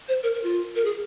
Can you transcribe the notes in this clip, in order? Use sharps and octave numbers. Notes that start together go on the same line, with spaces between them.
C5
A#4
A#4
F4
A#4
G#4